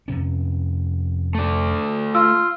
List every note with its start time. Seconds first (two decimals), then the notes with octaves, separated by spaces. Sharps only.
0.08 F2 C3 C#4
1.35 A3 D5
2.15 F4 E6